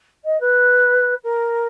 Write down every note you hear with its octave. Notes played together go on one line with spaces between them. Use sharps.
D#5
B4
A#4